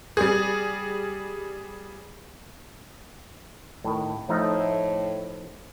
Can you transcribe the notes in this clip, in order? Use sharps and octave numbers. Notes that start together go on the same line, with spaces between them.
G3 G#4
A2 D#3
A2 F3 A3 D#4